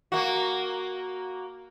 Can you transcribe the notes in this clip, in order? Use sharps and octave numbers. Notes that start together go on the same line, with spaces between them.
A#3 F#4